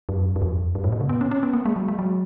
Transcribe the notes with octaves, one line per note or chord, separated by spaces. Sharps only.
F#2
F#2
F2
F#2
G#2
A#2
C#3
B3
C#4
C#4
B3
A#3
G#3
F#3
G#3
F#3